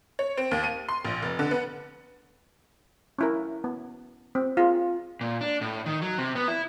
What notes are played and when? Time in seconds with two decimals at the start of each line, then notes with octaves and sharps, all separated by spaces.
0.19 C#5
0.37 C4
0.51 D#2
0.64 D#7
0.89 C6
1.05 A#1
1.22 F1
1.39 D3
1.51 B3
3.19 C#4 E4 A#4
3.64 B3
4.35 C4
4.57 F4 G#4
5.21 A#2
5.41 D4
5.61 A2
5.86 D#3
6.01 F#3
6.18 C3
6.35 B3
6.48 E4